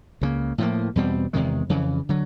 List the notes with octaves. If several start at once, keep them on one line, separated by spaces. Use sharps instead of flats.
C#2 C#3 F3 A#3
A2 F3 A#3
E2 B2 G3 C4
E2 C3 D#3 G#3
F2 C#3 E3
D3 F#3